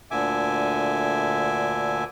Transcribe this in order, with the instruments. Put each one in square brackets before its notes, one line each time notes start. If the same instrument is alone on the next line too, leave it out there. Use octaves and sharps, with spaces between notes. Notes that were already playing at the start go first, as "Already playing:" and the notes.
[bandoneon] D2 A#2 D3 E5 G#5 D6